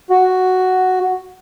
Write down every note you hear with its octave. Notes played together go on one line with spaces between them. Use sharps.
F#4